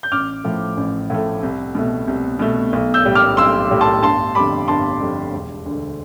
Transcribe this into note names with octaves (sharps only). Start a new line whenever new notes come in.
G6
A1 D6 F6
A2 F3 A3
A1
A2 F3 A3
C2
B2 A3
C2
B2 A3
B1
E6 G6
A2 G3
D6 F6
B1 C6 E6
A2 G3
A5 C6
G1 A5 C6
F2 D3 G3 B5 D6
G1 A5 C6
F2 D3 G3
E1
D2 D3